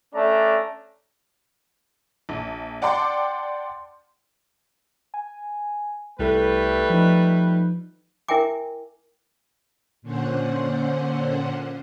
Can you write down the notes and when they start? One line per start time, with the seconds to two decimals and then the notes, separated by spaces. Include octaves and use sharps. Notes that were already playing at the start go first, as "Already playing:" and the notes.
0.14 A3 C#4 D4 D5 A#5
2.29 A#1
2.82 D5 F#5 G5 A5 C6 D6
5.14 G#5
6.19 C2 G3 A3 E4 A4 B4
6.90 F3 D#4
8.29 E4 A#4 E5 G5 G#5 D6
10.02 A#2 D3 C#4 C5 F#5